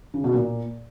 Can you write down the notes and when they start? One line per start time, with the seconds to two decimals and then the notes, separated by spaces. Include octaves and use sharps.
0.14 C#3
0.24 B2
0.34 A#2